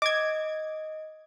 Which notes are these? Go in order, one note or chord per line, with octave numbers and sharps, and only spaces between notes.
D#5 D6 G#6